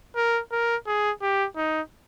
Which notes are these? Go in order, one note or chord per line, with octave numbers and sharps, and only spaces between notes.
A#4
A#4
G#4
G4
D#4